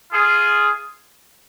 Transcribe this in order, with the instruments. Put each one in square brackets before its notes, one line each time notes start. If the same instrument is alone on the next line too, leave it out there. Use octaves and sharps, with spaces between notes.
[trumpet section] F4 G#4